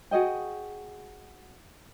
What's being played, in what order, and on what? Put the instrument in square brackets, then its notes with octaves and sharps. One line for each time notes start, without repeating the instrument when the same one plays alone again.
[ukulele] F#4 G#4 D#5 G5